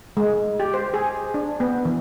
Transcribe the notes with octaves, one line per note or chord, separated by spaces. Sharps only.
G#3
G4
C5
G#4
D4
B3
E3